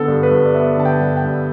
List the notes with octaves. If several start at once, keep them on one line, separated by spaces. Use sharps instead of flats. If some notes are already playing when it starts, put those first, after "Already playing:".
Already playing: D3 B3 A4
G2
B4
G2
D5
B3 E5
D3 A5
G5
G2
G5
G2